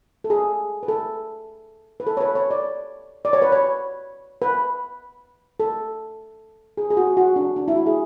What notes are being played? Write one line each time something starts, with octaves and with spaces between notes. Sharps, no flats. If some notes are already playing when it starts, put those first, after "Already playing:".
A4
G#4
B4
A4
B4
A4
C#5
B4
C#5
D5
D5
C#5
B4
C#5
B4
A4
G#4
G#4
F#4
F#4
D4
D4
E4
F#4
G#4